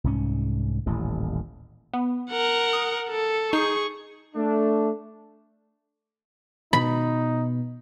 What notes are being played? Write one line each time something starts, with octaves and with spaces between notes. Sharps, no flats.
C2 G#2 C#4
D#1 A1 A2
B3
A#4 F#5
D#6
A4
D#4 G#4 C#6 G6 C7
A3 D4
B2 D#4 B5